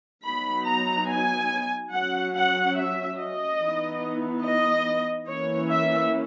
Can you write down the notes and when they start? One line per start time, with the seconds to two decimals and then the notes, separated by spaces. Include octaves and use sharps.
0.25 F#3 B3 D#4 B5
0.67 A#5
1.09 G#5
1.92 F#3 C#4 F#5
2.34 F#5
2.76 E5
3.18 D#5
3.60 E3 B3 D#4
4.44 D#5
5.28 E3 A#3 C#4 C#5
5.70 E5